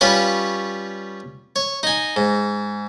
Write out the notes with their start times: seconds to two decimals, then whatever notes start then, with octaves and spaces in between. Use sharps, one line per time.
0.01 G3 C#4 F4 B4 C#5
1.56 C#5
1.83 D#4 G#5
2.16 G#2